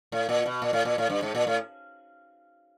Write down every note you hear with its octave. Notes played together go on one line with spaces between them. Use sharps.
A2
A#2
B2
A#2
A2
A#2
A2
G2
G#2
A#2
A2